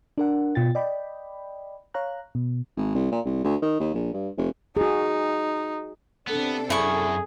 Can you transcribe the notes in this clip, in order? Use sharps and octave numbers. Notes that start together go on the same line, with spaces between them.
D4 A#4 F#5
B2 F4 G5 A6
D5 D#5 G5 B5
C#5 F5 A#5 F#6
B2
G#1
C2
A#2
C2
D2
D#3
D#2
A#1
G2
F1
D#4 F#4 G#4
C3 B3 D4 A4
F#2 E4 G#4 C#6